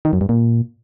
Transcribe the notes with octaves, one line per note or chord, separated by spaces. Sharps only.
D#3
F#2
G2
A#2